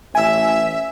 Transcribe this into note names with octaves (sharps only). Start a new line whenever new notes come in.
A1 E5 G#5 E6